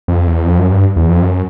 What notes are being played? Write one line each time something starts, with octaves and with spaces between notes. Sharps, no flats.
F2
E2
F2
F#2
G2
E2
F2
F#2